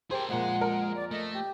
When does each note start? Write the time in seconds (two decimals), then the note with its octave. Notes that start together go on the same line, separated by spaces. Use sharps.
0.11 G4 G#4 A#4 C5
0.29 F2 A#2 F3 G#3 G#4 F#5
0.61 A#4
0.95 D5
1.11 A3 D#5
1.34 G4